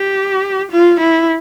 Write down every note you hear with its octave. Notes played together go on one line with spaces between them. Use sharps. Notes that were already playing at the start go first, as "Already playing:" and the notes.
Already playing: G4
F4
E4